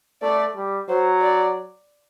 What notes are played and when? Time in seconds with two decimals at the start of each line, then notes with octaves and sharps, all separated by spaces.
0.22 A3 D5
0.55 G3
0.88 F#3 C5
1.22 D5